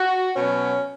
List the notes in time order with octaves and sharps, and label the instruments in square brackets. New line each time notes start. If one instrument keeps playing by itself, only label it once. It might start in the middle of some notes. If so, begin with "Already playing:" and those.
Already playing: [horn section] F#4
B2 F#3 C#4